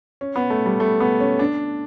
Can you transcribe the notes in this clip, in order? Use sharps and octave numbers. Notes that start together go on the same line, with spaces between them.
C#4
B3
A3
G3
A3
B3
C#4
D4